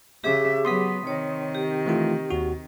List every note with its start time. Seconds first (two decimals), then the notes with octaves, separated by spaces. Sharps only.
0.24 C#3 G4 G#4 E5 D6
0.65 F#3 B3 C6 D#6 B6
1.07 C3 D#3 C#5
1.55 G4
1.86 E3 A3 F4
2.30 D#2 F#4